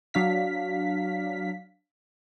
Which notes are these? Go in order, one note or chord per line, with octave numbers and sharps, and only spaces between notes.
F#3 D4 F5 B6